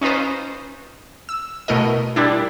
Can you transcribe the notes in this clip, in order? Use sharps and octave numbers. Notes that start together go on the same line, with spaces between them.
C#4 D#4 F4 B4 C5
E6
B2 A3 E4 A#4 D#5
A#2 G3 D4 E4